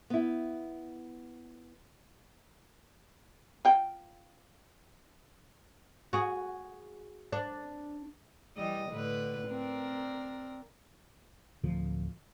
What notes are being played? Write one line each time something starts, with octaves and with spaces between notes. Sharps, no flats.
B3 E4
F4 G5
F#4 G#4
D4
E3 G3 D#5
A2 D3 B4
C4 D4 A#4
D1 D3 F3